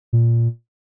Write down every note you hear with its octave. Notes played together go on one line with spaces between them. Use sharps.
A#2